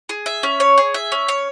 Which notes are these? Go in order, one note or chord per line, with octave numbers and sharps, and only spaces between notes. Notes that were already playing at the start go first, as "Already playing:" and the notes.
G#4
E5
C#4
C#5
G#4
E5
C#4
C#5